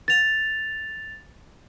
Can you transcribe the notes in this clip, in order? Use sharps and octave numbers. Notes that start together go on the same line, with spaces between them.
A6 F7